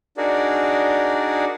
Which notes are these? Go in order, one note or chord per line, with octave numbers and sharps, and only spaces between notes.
D4 D#4 F#4 G#4 A#4 D5